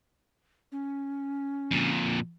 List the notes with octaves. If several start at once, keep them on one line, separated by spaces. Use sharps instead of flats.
C#4
F2 A#2